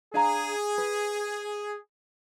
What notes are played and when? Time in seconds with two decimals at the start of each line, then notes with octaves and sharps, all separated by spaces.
0.14 D4 G#4 F5 A#5
0.78 B4